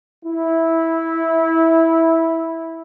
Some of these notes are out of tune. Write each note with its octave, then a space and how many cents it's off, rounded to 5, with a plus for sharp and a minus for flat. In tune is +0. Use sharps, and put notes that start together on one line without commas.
E4 -10